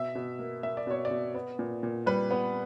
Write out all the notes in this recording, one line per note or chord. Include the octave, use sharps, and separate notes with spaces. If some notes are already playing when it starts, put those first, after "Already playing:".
Already playing: B2 E5
B2
A#3
A#3 E5
D5
B2 C#5
D5
B2
B3
A#2
A#2
G3 B4
B3